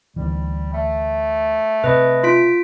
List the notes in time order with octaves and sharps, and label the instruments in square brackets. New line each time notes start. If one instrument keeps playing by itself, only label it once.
[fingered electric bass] D2 E3 [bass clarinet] G3
[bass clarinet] A3
[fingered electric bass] C3 [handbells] B4 D#5
[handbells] F4 B6 D7